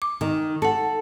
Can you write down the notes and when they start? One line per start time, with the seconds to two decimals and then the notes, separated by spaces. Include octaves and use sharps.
0.02 D6
0.21 D#3
0.62 A4 F#5 A5